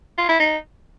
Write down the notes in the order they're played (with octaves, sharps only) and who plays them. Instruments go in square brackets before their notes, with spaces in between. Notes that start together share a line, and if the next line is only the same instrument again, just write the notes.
[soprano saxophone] F4
E4
D#4